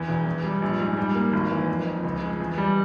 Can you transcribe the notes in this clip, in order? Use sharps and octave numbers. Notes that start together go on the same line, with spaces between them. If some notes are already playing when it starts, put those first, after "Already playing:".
Already playing: E2
E1
E2
G3
A#1
G#2
G3
A#3
G#1
E3
F2
F2
C#2
G#3
E2
G3